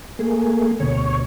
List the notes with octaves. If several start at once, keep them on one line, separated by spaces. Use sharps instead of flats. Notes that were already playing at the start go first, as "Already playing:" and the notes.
A3 A#3 G#4
D2 B2 C#5